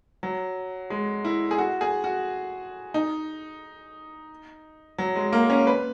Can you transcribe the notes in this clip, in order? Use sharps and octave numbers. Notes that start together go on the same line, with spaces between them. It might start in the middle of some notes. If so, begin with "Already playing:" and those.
F#3
G#3
E4
G#4
F#4
G#4
F#4
D#4
F#3
G#3
A#3
C#4
B4